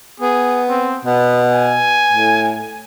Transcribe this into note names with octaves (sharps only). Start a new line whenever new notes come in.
B3 G#4
C4
B2 B3
G#5
A2